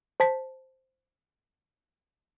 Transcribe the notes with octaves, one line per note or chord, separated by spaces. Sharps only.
C5 A5 B6